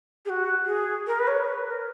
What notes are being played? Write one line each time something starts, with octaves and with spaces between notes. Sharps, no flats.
G#4
F#4
G#4
A#4
B4
C#5
B4
A#4